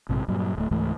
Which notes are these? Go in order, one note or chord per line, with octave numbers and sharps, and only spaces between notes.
A#1 G#2 C3
G2 A#2 F#3
D1 A3
C#2 G#2 E3 A3